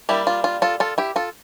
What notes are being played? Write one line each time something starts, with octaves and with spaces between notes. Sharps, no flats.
G3 A#3 D4 E4 G4
F4
F4
F4 A4
F4 A4
E4 G4
F4 A4